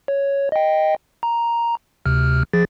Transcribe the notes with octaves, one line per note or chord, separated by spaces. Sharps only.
C#5
D#5 G5
A#5
D2 C3 F6
F3 G#4 A6